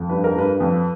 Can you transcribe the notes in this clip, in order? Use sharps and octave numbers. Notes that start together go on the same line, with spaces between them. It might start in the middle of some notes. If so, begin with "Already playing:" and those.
Already playing: F2
G2 B4
A#4
G2 B4
F2